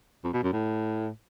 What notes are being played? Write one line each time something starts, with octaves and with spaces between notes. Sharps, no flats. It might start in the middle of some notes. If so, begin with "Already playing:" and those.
F2
B2
F#2
A2